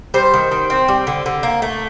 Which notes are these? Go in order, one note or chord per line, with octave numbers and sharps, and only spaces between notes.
G3 C5
D#3
D#3
C4
G3
D3
D3
A#3
A3